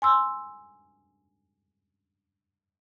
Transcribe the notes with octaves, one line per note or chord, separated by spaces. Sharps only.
G#5 C6 E6